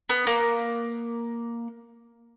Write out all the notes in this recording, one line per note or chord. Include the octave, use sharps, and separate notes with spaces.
B3
A#3